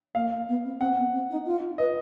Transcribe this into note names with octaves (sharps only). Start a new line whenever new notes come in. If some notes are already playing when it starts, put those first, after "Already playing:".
A#3 F5
B3
C4
C4 F#5
B3
C4
D#4
F4
B4 D#5